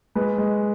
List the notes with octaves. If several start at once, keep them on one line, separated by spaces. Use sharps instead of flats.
G#3 B4
G#3